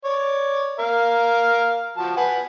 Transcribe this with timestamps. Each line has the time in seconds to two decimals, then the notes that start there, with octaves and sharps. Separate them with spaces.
0.05 C#5 D5
0.79 A#4 F5
1.97 F3 F#4 A5
2.17 B4 F#5 G#5